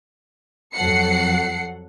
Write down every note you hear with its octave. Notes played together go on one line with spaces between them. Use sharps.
F2 F#3 A4 F#5 C7 C#7